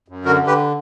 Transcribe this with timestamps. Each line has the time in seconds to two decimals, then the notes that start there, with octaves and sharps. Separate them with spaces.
0.08 F#2
0.25 D3 F#4 A#4
0.41 D3
0.47 G4 B4